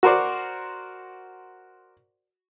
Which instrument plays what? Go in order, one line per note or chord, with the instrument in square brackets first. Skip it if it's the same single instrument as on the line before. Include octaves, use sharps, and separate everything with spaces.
[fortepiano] F#4 A#4 C5 D5